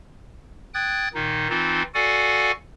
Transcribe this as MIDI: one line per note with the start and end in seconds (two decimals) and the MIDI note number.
0.74 1.08 79
0.74 1.08 87
0.74 1.08 90
0.74 1.08 92
0.74 1.08 93
1.14 1.49 46
1.14 1.49 51
1.14 1.49 63
1.50 1.83 52
1.50 1.83 60
1.50 1.83 63
1.50 1.83 65
1.94 2.52 66
1.94 2.52 69
1.94 2.52 74
1.94 2.52 77
1.94 2.52 78
1.94 2.52 80